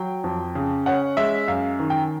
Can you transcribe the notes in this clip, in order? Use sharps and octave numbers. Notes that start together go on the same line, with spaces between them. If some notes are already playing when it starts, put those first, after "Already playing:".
Already playing: F#3 G5
F2
C#3
C#4 F#5
G#3 E5
F#2 F5
D#3
G5